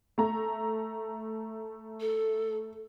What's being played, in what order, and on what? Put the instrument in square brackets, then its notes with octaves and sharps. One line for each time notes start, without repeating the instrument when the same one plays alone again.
[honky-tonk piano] A3 A#5
[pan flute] A4